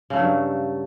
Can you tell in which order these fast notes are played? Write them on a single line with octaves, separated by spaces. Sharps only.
C#3 A3 F#3 G2